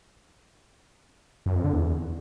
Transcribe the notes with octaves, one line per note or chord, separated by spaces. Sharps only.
F#2
F2
D3
E2